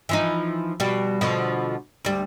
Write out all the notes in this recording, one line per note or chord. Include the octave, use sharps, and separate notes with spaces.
E3 F3 D#4
B2 G3
B2 D3 F3
D2 G3